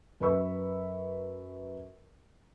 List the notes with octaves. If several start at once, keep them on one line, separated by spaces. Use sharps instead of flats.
F#2 B4 B5 C#6 E6